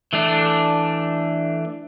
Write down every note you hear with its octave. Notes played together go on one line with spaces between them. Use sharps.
E3 A3 D4